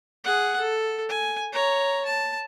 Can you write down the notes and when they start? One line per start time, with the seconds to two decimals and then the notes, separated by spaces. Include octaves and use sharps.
0.23 G#4 F#5
0.59 A4
1.09 G#5
1.52 C#5 A#5
2.05 A5